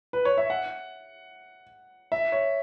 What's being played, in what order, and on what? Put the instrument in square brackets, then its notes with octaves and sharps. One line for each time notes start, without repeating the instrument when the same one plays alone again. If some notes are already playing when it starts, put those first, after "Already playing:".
[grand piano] B4
C#5
E5
F#5
E5
C#5